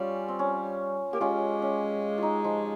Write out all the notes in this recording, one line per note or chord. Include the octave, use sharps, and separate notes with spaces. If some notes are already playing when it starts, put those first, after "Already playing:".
Already playing: G3 C#4 F4
C4
C#4
A#3 G4
G#3 C#4 F4
C#4
D#4 F4
F3